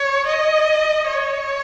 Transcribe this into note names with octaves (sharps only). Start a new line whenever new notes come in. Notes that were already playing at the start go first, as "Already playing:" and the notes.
Already playing: C#5
D#5
C#5